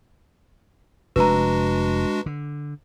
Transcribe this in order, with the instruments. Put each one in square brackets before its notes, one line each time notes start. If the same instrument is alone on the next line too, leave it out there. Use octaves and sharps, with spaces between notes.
[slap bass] F1 [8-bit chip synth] G#3 D4 F#4 [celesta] B4 A#5
[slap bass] D3